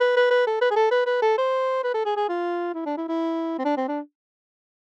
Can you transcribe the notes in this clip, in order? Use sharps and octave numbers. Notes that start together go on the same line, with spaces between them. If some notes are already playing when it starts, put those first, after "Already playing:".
B4
B4
B4
A4
B4
G#4
A4
B4
B4
A4
C5
B4
A4
G#4
G#4
F4
E4
D4
E4
E4
C4
D4
C4
D4